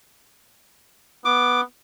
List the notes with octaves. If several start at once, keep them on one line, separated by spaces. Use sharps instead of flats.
B3 D6